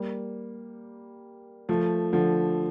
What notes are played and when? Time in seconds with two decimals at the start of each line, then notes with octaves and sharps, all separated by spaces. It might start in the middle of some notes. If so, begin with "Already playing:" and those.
Already playing: G3 A#3
1.69 F3 A3
2.13 D3 F3